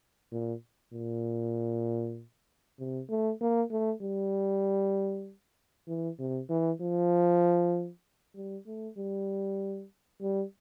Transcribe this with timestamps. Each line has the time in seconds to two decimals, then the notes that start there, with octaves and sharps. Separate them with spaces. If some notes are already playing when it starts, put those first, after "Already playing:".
0.32 A#2
0.93 A#2
2.79 C3
3.10 A3
3.41 A#3
3.71 A3
4.02 G3
5.88 E3
6.19 C3
6.49 E3
6.81 F3
8.35 G3
8.67 A3
8.97 G3
10.22 G3